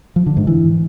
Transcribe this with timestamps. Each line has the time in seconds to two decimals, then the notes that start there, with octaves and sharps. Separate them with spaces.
0.16 F3
0.26 D3
0.37 G#2
0.47 E3